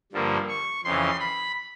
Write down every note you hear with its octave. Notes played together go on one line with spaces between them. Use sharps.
G2 D3 F3 A#3
C#6
F2 C#3 E3 C6
B5